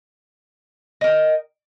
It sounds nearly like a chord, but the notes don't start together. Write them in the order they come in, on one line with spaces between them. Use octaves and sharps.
D#5 A#4 G5